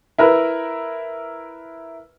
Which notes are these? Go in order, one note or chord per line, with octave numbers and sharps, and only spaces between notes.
E4 A#4 B4 E5